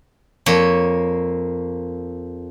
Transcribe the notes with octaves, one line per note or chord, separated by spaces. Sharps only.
F2 A#3 C#5